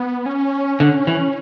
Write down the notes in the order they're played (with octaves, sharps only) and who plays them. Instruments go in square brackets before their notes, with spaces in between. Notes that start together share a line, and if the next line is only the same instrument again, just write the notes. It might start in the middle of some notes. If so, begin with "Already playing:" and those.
Already playing: [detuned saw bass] B3
C#4
[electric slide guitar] D3
E3